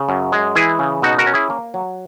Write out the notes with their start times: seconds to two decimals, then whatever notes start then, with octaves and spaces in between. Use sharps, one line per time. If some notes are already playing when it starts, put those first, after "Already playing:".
Already playing: C#3
0.09 F#2
0.32 G#3
0.55 E3 E4 G#4
0.79 C#3
1.02 B2 D#4 F#4
1.18 F#4 A#4
1.27 C#4
1.34 E4 G#4
1.50 A#3
1.74 F#3